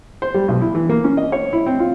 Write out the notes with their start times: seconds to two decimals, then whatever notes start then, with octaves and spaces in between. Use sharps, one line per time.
0.22 C5
0.34 G3
0.48 B1
0.61 E4
0.75 E3
0.89 A#3
1.04 C#4
1.17 D#5
1.32 C#5
1.53 E4
1.66 C4
1.80 F4